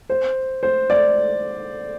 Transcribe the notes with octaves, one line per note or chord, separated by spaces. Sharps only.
C5
C5
D5